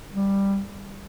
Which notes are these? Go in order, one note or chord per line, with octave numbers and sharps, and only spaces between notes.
G3